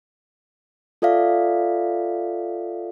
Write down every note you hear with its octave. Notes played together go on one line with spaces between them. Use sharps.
F4 A4 D5 E5 F5